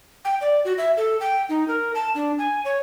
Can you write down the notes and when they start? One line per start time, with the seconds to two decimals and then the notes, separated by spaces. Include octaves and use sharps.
0.25 G5
0.41 D5
0.65 F#4
0.78 E5
0.97 A4
1.21 G5
1.49 D#4
1.68 A#4
1.95 A5
2.15 D4
2.38 G#5
2.65 C#5